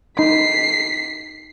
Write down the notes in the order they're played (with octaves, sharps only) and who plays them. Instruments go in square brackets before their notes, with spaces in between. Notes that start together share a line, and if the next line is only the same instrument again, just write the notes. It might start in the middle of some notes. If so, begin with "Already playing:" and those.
[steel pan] D#4 [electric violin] B6 C7